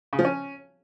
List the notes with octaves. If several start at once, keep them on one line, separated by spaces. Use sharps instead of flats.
C#3
F3
C#4